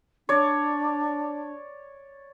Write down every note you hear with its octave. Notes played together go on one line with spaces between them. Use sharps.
D4 C#5 D5